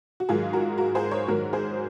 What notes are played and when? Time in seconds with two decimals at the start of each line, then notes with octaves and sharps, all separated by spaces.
0.20 F#4
0.29 G#2 D#3 F#3 F4 G#4
0.53 F#4 A#4
0.78 F#4 A#4
0.95 G#4 C5
1.11 A#4 C#5
1.27 G#2 D#3 F#3 F#4 A#4
1.53 G#4 C5